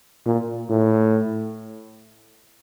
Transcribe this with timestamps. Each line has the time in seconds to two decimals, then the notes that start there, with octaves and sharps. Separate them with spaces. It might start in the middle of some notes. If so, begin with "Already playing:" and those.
0.26 A#2
0.70 A2